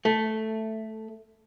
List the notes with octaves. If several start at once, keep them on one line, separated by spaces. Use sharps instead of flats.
A3